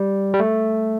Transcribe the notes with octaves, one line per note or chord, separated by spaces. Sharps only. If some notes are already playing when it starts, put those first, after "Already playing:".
Already playing: G3
G3
A3